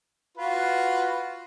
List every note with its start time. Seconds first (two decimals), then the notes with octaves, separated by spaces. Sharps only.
0.37 F4 F#4 B4